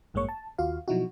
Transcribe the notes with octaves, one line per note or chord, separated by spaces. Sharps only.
A1 G2 G#3 A#3 C#5 C#6
A5
D#2 F4 F#4 F5
B2 F3 F#3 D#4 E4 F#4